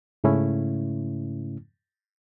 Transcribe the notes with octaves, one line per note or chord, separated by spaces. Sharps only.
G#2 C#3 A3 C#4 E4